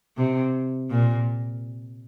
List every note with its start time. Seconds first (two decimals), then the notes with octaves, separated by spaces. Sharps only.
0.17 C3
0.91 A#2